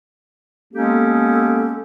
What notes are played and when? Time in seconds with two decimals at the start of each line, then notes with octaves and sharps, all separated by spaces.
0.74 G#3 A#3 B3 C#4 G4 A4